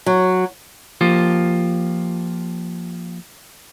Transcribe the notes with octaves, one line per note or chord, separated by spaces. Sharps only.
F#3
F3 A#3 F4 G4 C5